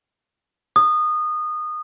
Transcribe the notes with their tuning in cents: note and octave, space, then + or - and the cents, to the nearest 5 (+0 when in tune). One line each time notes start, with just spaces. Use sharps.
D#6 -20